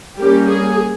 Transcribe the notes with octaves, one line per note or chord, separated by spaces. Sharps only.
G3 A#3 C#4 G4
G#4